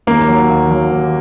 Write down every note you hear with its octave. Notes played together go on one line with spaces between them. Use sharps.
D#2 A#3
F#3
D#2
F#3
D#2